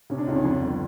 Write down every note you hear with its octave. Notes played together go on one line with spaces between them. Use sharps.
C3 C#4
D4
C#2 D#4
C#4
F2 D4
G1